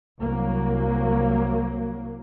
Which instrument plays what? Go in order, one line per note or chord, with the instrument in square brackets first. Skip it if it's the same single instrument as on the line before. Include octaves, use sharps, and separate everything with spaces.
[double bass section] C2 F#3 A#3